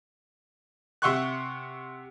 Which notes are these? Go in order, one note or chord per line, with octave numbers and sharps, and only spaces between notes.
C3 E5 F#5 C6 C#6 F#6